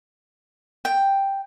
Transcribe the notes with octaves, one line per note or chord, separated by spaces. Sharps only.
G5